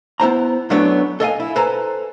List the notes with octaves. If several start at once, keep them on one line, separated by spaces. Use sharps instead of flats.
B3 E4 C5 A#5
F#2 F#3 A3 B3 D4 C#5
A4 D#5 F5 G#5
E4
A4 B4 C5 G#5 A#5